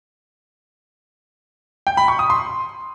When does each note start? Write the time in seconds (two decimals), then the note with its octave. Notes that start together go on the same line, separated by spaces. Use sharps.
1.87 G5
1.97 B5
2.08 C#6
2.19 D#6
2.30 C6